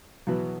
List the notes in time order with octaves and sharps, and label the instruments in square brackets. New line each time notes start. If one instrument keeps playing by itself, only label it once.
[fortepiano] E2 B2 F#3 B3